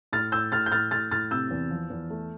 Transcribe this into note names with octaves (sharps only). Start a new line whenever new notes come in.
A2 F6 A6
A2 E6 G6
A2 F6 A6
G6
A2 F6 A6
A2 F6 A6
A2 F6 A6
C3 E6 G6
E2
F3
E2
A3